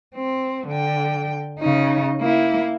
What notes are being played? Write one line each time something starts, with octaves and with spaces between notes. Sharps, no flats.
C4
D3 G5
C#3 D#4
A#3 E4